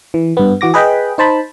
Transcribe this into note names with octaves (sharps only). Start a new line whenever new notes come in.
E3
G2 B3
E3 F#4 D6 A#6
G#4 B4 D#5 G5 B5
D#4 C5 A5 B5